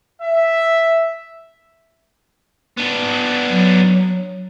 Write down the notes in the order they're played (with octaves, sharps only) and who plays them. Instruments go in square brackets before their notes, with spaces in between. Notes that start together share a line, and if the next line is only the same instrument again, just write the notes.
[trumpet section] E5
[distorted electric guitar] B3 D4
[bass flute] F#3